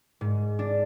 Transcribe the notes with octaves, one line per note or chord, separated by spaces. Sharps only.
G#2
D4